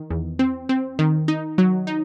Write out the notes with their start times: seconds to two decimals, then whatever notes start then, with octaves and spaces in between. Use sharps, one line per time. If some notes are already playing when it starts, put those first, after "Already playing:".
Already playing: D#3
0.10 E2
0.39 C4
0.69 C4
0.99 D#3
1.28 D#4
1.58 F#3
1.87 D#4